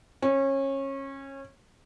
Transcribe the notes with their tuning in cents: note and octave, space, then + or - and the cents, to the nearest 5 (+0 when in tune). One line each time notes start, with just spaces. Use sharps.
C#4 -25